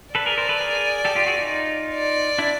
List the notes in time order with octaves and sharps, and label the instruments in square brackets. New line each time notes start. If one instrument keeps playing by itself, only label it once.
[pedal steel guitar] A4 B4 [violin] D5
[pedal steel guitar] G#4 A#4
A#4 C5
A4 B4
G#4 A#4
G4 A4
F4 G4
F#4 G#4
D#4 F4
[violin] D5
[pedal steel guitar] D4 E4